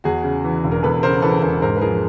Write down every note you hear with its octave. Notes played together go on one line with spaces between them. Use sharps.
E2 F#4 G#4
C#3
E3
E1
A#4
E2 A4 B4
C#3 A#4 C5
E3 A4 B4
E1 A#4 C5
G#2 A#4 C5
B4
F3 G#4 A#4